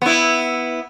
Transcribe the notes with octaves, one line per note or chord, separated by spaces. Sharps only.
B3 E4